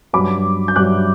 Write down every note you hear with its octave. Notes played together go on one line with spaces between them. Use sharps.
G2 F#3 B5 D6
G6
G2 F#3 D6 F#6